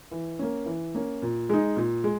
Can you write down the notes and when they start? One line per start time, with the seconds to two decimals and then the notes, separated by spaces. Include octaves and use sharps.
0.11 E3
0.39 A#3 C#4
0.66 E3
0.95 A#3 C#4
1.22 A#2
1.49 G#3 D#4
1.76 A#2
2.04 G#3